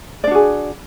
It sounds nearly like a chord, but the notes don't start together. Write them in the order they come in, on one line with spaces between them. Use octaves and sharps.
D5 D4 F#4 G#4